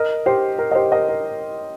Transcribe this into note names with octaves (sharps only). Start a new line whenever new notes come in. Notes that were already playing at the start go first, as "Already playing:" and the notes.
Already playing: A#4 D#5
G4 C5
A#4
D#5
G4 C5
A#4 D#5
A#4